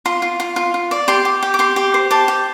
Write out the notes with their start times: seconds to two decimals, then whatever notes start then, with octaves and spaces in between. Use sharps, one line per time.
0.06 F4 C6
0.22 F4
0.40 F4
0.56 F4
0.74 F4
0.91 D5
1.08 G4 C6
1.25 G4
1.43 G4
1.54 D6
1.59 G4 C6
1.76 G4
1.94 C5
2.11 G4 A5
2.28 G4